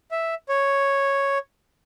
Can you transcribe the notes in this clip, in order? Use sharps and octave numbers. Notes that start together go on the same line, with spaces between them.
E5
C#5